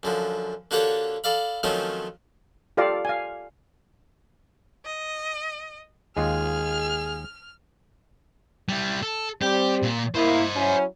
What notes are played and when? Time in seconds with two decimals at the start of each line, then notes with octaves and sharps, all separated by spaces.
0.03 F#2 D3 F3
0.71 D3 A#3 F#4 G4 A4 C#5
1.24 A4 D5 F5 B5
1.63 D#3 F3 F#3 A3 C4 C#4
2.77 F4 G4 A4 D5 F5
3.05 F5 G#5
4.85 D#5
6.17 D#2 G#3 F4 G#4 F6
8.69 G3 E4
9.02 A4
9.42 G3 C4 G4
9.83 A#2
10.15 A#3 E4 C5 D#5
10.56 F#3 C#4 E4